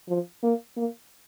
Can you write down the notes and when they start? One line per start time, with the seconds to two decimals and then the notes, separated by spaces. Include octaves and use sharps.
0.09 F3
0.43 A#3
0.77 A#3